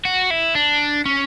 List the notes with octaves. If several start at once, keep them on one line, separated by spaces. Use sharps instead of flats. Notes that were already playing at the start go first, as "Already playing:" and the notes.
F#4
E4
D4
C#4